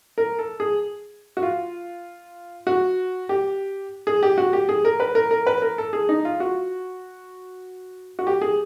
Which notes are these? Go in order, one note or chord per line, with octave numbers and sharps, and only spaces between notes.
A#4
A4
G#4
F#4
F4
F#4
G4
G#4
G4
F#4
G4
G#4
A#4
B4
A#4
A#4
B4
A#4
A4
G#4
D#4
F4
F#4
F#4
G4
G#4